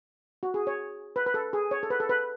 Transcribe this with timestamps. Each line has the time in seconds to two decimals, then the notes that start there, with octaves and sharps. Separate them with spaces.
0.43 F#4
0.54 G#4
0.67 C#5
1.16 B4
1.26 B4
1.34 A4
1.53 G#4
1.71 C#5
1.83 A4
1.90 B4
2.00 A4
2.09 B4